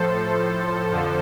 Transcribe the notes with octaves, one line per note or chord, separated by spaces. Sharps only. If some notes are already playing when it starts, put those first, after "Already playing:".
Already playing: A2 F3 A4 C5
F2 D3 F3